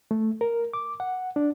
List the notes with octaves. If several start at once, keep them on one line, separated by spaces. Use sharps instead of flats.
A3
A#4
D6
F#5
D4